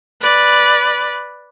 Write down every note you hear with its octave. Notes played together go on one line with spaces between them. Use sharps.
B4 D5